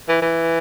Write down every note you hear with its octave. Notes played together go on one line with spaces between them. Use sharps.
E3
E3